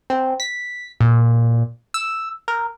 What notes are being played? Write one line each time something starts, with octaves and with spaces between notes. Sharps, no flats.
C4
B6
A#2
E6
A#4